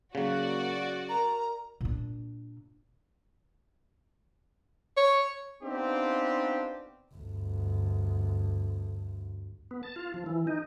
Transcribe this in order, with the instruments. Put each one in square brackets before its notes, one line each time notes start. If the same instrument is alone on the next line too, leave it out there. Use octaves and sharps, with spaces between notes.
[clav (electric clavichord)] C#3 F#3 [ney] A#3 [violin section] F#4 D5
[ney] A#4 [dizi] A#5
[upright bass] A#2 D4
[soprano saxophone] C#5
[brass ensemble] B3 C4 D4 D#4 F4 G4
[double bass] G1 D2
[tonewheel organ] B3
A5
F4
F3
E3
D#4